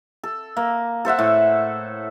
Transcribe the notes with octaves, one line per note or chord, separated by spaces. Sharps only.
A4
A#3
A4 C5 E5 F#5
A2